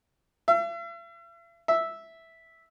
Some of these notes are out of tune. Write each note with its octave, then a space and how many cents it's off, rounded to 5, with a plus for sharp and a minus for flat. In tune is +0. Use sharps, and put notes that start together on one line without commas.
E5 +45
E5 -5